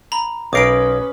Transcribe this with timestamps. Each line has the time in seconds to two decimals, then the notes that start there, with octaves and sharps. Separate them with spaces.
0.12 A#5 B5
0.53 B1 C#4 A#4 B4 D6 D#6 C7 D7